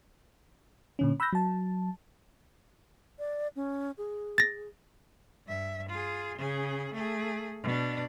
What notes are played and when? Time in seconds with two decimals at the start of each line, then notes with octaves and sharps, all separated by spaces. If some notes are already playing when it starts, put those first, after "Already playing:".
0.99 A#2 D3 C#4
1.20 B5 E6 F#6 G6 A#6
1.33 F#3 A5
3.19 D5
3.56 C#4
3.98 G#4
4.38 A6 A#6
5.47 G2 E5
5.89 F4 G#4
6.38 C#3 G#4
6.94 A3 G#4
7.63 B2 D4